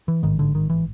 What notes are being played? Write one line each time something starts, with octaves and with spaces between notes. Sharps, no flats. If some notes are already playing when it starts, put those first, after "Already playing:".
E3
A1 G#2 D#3
D3
D#3
E3